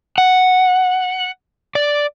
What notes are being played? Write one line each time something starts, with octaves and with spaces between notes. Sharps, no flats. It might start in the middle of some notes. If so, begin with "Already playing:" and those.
F#5
D5